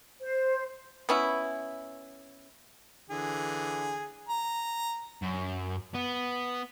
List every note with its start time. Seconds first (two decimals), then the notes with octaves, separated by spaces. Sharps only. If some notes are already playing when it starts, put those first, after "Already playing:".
0.20 C5
1.09 B3 C#4 E4
3.10 D3 E3 G#4
4.29 A#5
5.22 F#2
5.95 B3